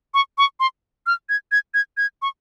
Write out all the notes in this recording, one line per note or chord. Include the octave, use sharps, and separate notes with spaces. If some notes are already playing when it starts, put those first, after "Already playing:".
C#6
C#6
C6
F6
G#6
G#6
G#6
G#6
C#6